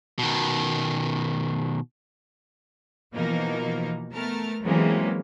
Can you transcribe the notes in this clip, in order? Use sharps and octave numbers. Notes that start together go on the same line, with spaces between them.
B2 D#3
B2 E3 F3 A#3 D#4 A#4
A3 B3 A#4 A5 A#5 F6
C3 E3 F#3 G#3 A#3 C#4